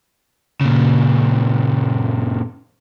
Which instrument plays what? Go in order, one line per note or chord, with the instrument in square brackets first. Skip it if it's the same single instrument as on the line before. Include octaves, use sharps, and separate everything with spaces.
[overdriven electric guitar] A#2 C#3